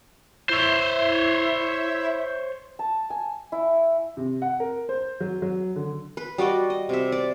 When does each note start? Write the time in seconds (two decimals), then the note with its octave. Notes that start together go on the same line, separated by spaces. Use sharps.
0.49 E4 C5 C#5 E5
2.79 A5
3.10 G#5
3.52 E4
4.17 C3
4.42 F#5
4.60 A#4
4.89 C5
5.20 F#3
5.42 F#3
5.76 D3
6.17 B4
6.38 G3 F#4 D5 D#5
6.70 D#5
6.89 C3 E5
7.12 D5